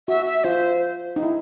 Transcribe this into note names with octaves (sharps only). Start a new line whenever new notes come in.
F#4 E5
E5
F4 C5
D#4
E4